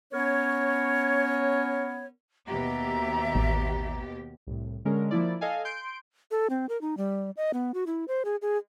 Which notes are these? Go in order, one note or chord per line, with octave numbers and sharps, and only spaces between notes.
B3 C#4 A#4 C#5
D#2 B2 G4 E5 A#5
A1
C2 A2
D3 G#3 C#4 A#4
F3 A#3 E4 D5
A4 D#5 F5 G#5
C6 G6 D7
A4
C4
A#4
D#4
G3
D#5
B3
F#4
E4
C5
G#4
G#4